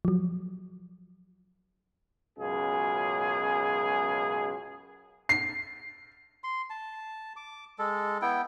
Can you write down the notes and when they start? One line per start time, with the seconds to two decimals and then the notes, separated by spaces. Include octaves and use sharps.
0.05 F3 F#3
2.38 C#2 F#2 B2 G#4
5.29 C7
6.44 C6
6.70 A5
7.36 D6
7.79 G#3 A4
8.22 B3 E4 G5